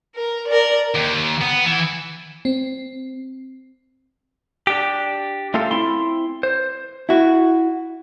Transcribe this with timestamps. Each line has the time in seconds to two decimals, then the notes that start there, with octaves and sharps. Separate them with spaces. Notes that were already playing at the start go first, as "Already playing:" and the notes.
0.15 A#4
0.47 A#4 D5
0.95 D#2
1.41 B3
1.66 E3
2.45 C4
4.67 D4 G4
5.54 A3 C#4 F4 A4 F5
5.71 C4 E4 C6
6.43 C5
7.09 E4 F#4